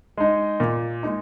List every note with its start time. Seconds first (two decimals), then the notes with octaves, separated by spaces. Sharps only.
0.17 G#3 D#4
0.60 A#2
1.03 G#3 D#4